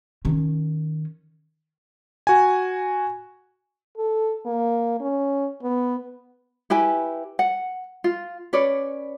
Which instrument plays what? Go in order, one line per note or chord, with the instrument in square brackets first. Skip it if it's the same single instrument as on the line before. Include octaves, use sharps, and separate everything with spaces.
[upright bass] D#3 C#4
[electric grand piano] F#4 G#5
[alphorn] A4
A#3
C#4
B3
[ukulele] E4 G4 B4 G#5
F#5
F4
C#4 B4 C#5 D5